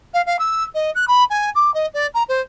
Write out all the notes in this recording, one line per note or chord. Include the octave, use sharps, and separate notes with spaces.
F5
F5
E6
D#5
F#6
B5
G#5
D6
D#5
D5
A#5
C5